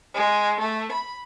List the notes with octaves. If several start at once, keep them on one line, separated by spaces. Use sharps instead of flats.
G#3
A3
B5